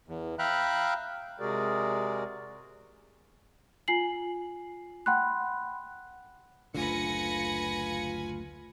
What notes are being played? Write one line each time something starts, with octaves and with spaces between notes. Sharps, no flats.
E2
E5 F5 G5 A#5 B5 F#6
C3 G#3 F#4 G#4 A#4 D5
F4 G#5 C7 F#7
F#5 G5 B5 C6 F#6
F#1 D2 D3 F4 B4 G#5 A#6 C#7